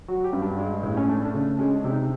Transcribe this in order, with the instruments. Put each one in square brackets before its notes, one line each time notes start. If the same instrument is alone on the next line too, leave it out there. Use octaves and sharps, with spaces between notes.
[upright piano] F#3 [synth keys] F#4
[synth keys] G4
[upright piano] G2
[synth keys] D4
[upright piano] G#3
A2
[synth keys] C#4
[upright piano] A3 [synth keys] D4
[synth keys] D4
[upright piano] C#3
[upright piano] G#3 [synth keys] C#4
[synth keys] D4
[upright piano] C3
[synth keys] D#4